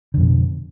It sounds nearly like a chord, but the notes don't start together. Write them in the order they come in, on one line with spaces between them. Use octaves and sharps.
D3 F2 B2